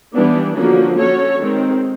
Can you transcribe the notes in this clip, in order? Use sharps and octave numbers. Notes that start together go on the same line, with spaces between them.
E3 G3 B3 D4
D3 F3 A#3 C#4 F#4
C#4 F#4 A4 C#5
D#3 G#3 C4